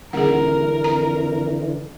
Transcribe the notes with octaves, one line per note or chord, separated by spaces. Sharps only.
D#1 D3 E3 G#4 A#4 F#5
F2 A#5